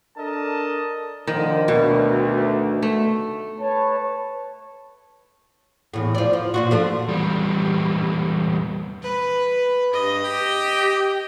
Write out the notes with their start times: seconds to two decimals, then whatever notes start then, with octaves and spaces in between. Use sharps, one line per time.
0.17 D4 A4 A#4 D#5 A5
1.27 D3 D#3 F3
1.68 D2 B2
2.82 A3
3.59 B4 C#5 A5
5.94 E2 A2
6.15 F3 D5
6.33 F3
6.54 A#2 F4 F#4
6.71 F3 A3 D4
7.09 E2 G3
9.02 B4
9.94 G2 D#5
10.24 G4